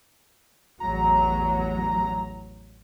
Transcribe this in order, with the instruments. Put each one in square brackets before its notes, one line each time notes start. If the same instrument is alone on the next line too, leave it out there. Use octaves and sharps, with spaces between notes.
[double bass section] A1 E2 F#3 [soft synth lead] A#5